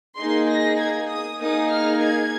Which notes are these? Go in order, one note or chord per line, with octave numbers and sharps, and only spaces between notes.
A#3 D#4 G#4 C6
A#6
G#6
D#6
A#3 D#4 G#4 D#6
F6
G#6